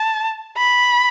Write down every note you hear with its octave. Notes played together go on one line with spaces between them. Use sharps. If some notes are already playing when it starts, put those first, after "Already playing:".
Already playing: A5
B5